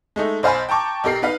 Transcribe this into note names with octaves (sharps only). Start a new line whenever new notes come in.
G#3 A3 D#4
B1 C5 F5 G#5 B5
G5 A5 A#5 C#6 D6
B1 G4 A#4 C7
D#4 B4 F5